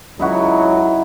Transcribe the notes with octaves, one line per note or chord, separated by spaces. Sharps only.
C#2 F#3 D#4 E4 F#4